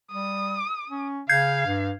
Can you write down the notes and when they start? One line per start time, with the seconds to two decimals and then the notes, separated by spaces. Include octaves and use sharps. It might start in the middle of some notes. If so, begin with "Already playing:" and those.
0.12 G3 D#6
0.90 C#4
1.29 C#3 F5 G6 G#6 C7
1.66 G2